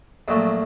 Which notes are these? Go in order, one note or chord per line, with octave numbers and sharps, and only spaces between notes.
A#1 A#2 F#3 A3